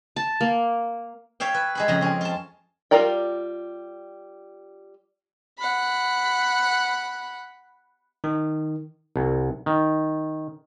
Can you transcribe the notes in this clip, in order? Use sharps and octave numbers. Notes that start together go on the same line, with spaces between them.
A5
A#3
C#5 E5 F5 G5
B4
G#3 G#4 B5
F2 C#3 A#5
C4 C#4
F4 A5
G3 F4 A#4 D5 G5
F#5 B5
D#3
C2
D#3